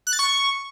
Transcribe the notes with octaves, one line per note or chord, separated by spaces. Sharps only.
F#6
A6
C#6